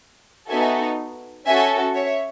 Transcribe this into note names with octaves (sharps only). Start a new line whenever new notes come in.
B3 D#4 F#4 A4 E5 G#5
C#4 F#4 A4 E5 G#5
C#5 E5